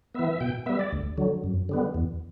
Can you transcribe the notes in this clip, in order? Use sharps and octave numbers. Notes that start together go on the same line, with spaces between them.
E3 B3 E5
B2 G5
G3 B3 E5
D5
D2
D3 F#3
F#2
D3 G3 B3
E2